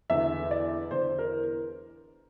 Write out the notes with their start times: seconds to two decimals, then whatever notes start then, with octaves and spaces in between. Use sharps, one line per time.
0.10 E2 D3 E5
0.51 D5
0.91 E2 D3 C5
1.19 A#4